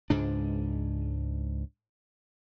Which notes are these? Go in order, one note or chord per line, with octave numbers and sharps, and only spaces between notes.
C#2 G#2 D4